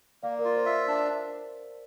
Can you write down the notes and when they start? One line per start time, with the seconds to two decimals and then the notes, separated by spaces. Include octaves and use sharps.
0.23 A#3 D5 F5
0.38 A#4 D5
0.45 F4
0.56 C5
0.66 E5
0.88 D4